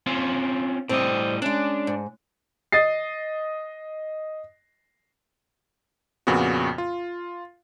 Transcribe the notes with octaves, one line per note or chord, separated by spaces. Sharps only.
C4 C#4 F4
A2 G3 C4 D#5
G#3 C#4 D4
G#2
D#5 A6 C7
F2 A#2 C#3 B3 F#4
F4